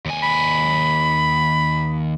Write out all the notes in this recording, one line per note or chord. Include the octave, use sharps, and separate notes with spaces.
D#2 G#5
B5